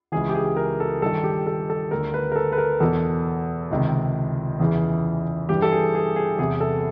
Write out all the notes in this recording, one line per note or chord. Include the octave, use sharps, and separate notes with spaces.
C#2 C#3 E3 G#4
G4
G#4
A#4
A4
G2 D#3 A4
G4
A4
A4
D2 D3 A#4
B4
A#4
A4
B4
A#4
E2 B2 A4
C#2 C3 D#3
E2 C#3 E3
G2 E3 G4
A4
G#4
G#4
G#4
E2 C3 E3 G#4
A4